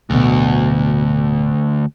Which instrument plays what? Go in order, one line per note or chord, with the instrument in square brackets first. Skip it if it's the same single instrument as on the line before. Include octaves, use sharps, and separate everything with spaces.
[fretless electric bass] D1 B2 [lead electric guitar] D2